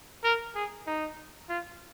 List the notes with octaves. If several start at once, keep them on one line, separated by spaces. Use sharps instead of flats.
A#4
G#4
D#4
F4